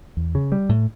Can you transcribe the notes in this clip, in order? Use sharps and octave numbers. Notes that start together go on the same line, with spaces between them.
E2
C#3
G3
A2